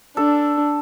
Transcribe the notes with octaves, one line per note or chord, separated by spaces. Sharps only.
D4 A4